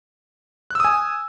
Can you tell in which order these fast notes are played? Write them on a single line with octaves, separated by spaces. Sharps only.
F#6 E6 D#6 G#5